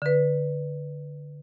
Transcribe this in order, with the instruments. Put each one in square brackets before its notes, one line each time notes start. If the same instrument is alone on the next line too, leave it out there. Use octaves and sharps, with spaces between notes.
[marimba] D3 B4